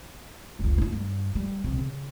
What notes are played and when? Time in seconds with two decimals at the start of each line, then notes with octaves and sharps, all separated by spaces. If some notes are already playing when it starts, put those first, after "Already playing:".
0.59 F1 C#2
0.78 D4 E4
0.92 G2
1.35 G3
1.64 C2 C3
1.79 C#3